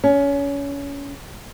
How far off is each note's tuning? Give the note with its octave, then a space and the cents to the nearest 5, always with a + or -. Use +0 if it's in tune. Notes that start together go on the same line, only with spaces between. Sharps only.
C#4 +25